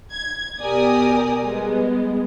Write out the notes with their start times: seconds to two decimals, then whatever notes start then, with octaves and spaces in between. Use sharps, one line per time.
0.13 G#6
0.61 B2 G4 A#4 D5 G#5 D#6
1.42 G3 G#3 B3